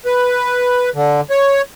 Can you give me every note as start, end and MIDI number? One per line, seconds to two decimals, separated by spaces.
0.06 0.90 71
0.94 1.21 50
1.30 1.62 73